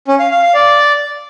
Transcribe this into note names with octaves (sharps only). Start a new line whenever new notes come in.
C#4
F5
F5
F5
D5